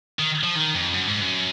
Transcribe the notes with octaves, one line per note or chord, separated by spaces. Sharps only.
D#3
F3
D#3
F2
F#2
G#2
F#2